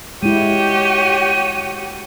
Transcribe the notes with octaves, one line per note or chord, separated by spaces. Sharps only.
G#3 E4 F#4 G4 C#5 D#7